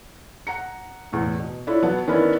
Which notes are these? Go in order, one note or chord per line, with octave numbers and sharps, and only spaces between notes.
F#5 A#5 C#7
E2 A2
B2
D4 E4 F4 A4 C#5
F#3 B3 F#5 A5
D#3 B3 C#4 D4 E4 A#4